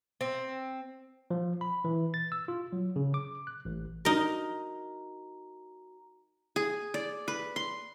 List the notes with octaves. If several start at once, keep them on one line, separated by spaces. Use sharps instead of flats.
C4
F3
B5
E3
A6
E6
F4
F#3
C#3
D6
F#6
A1
D#4 F#4 A#4 A#5
G#4
D5
B4
C6